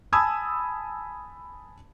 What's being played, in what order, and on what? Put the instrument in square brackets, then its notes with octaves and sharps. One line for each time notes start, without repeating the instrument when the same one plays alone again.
[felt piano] G#5 A5 B5 D#6 E6 G#6